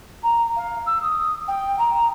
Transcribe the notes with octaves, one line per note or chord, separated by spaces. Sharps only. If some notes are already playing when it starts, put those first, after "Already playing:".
A#5
F5
E6
D#6
G5
A#5